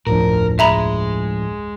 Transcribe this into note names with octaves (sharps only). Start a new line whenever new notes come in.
D1 G1 F2 A2 F3 D4 A#4
G#3 E5 A#5 B5